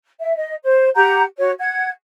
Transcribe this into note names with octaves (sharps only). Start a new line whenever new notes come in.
E5
D#5
C5
G4 F#5 A#5 G6
F#4 C#5
F#5 G#6